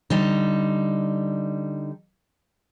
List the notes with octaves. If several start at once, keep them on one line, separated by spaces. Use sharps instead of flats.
D3 G3 D#4